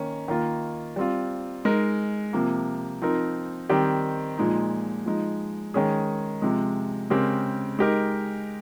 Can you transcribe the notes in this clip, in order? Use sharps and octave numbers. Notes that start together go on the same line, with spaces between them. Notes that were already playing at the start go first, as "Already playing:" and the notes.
Already playing: D#3 A#3 C#4
D#3 A#3 F4
G3 C4 F4
G#3 D#4 A#4
C3 F3 A#3
F3 C4 D#4 A#4
D#3 G3 C4 G4
A#2 F3 G#3 D#4
F3 G#3 D#4
D#3 G#3 C#4 G#4
C3 F3 G#3
C#3 G#3 C4 G4 A#4
G#3 D#4 G4 A#4